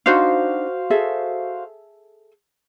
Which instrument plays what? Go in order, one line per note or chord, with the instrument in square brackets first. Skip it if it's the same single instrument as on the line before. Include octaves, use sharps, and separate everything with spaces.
[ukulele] D4 D#4 [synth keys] F#4 C5 F5
[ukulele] G#4 A4 E5